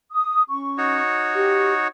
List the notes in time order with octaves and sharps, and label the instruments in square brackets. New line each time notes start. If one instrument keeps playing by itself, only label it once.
[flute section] D#6
C#4 C#6
[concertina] D#4 F#4 C#5
[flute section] G4